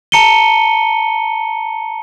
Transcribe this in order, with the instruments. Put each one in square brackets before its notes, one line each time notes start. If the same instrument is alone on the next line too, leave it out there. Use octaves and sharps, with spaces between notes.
[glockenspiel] A5 A#5 C#7 D#7 G7